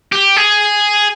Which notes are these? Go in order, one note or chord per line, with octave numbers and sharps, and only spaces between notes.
G4
G#4